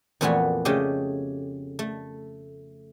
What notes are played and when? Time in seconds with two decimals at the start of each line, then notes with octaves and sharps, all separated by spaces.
0.21 F2 A#2 E3 A3 B3 F#4
0.65 C#3 A3 G4 D#5
1.79 A3